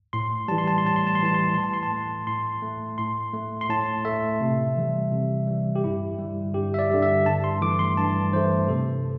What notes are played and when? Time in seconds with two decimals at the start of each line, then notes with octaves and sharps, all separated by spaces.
0.13 A2 C6
0.48 E3 G3 A5
0.58 C6
0.68 A5
0.78 C6
0.84 A2 A5
0.96 C6
1.07 A5
1.15 C6
1.20 E3 G3 A5
1.34 C6
1.44 A5
1.54 A2 C6
1.64 A5
1.73 C6
1.83 A5
1.92 A3
2.27 A2 C6
2.62 A3
2.98 A2 C6
3.33 A3
3.61 C6
3.69 A2 A5
4.05 A3 E5
4.41 C3
4.77 E3 G3
5.12 C3
5.47 E3 G3
5.76 G4
5.84 G2 E4
6.19 D3 G3
6.54 G2 G4
6.74 E5
6.79 D5
6.90 D3 G3
7.02 E5
7.26 G2 A5
7.44 C6
7.62 E3 A3 D6
7.79 C6
7.97 G2 A5
8.33 E3 A3 C5
8.68 C3 A4